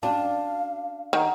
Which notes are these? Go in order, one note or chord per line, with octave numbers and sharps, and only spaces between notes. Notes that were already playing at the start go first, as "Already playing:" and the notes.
C#4 D4 F#4 F5 A5
D#3 C#5 F#5 A#5